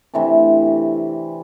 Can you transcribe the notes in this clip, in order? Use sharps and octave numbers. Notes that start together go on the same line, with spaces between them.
C3 E3 A3 D4